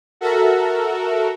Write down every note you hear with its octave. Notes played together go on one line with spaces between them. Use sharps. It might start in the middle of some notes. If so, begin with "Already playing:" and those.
F#4 A4 A#4 E5